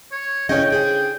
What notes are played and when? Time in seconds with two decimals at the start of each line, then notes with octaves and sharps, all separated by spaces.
0.12 C#5
0.49 C#3 E3 C#4 D#5 G5
0.70 D4 G#4 C5 G5